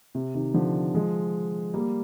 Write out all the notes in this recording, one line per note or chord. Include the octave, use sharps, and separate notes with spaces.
C3
C3 D#3
D3 F3
F3 G#3
G3 A#3